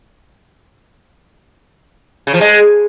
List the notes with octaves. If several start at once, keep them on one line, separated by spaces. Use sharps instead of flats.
C#3
F3
G#3